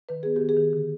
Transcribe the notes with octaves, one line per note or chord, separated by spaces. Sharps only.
D#3 B4
B3 G#4
D#3 G4
G#4
D#3
D3